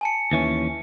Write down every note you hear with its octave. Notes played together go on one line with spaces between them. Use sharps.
G#5 A5 C#7
D#2 E3 C#4